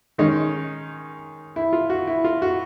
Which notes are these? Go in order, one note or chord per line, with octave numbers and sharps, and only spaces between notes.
D#3 G#3 C#4 D#4
E4
F4
F#4
E4
F4
F#4